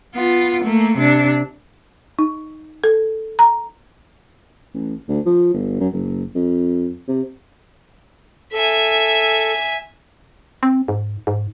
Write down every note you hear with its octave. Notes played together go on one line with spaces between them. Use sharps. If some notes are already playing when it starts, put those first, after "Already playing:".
B3 F4
A3 A#3
C3 D4
D#4
A4
A#5
A1
D2
F3
G1
F#2
F#1
F2
C3
A4 E5 G#5
C4
G#2
G#2